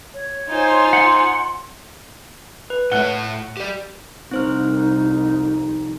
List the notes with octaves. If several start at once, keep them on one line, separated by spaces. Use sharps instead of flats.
C#5
D#4 F4 C5 G#5
F#5 C6
B4
A2 A3 C#5 F#5 F#6 G7
G4 D5
C2 F2 C4 D#4 C5 F6